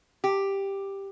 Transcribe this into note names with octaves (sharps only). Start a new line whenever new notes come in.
G4